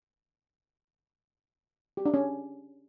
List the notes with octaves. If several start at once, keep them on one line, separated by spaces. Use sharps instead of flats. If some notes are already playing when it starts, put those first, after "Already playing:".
G4
D4
C#4